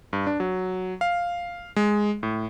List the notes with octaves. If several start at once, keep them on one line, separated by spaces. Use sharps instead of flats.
G2
D4
F#3
F5
G#3
A2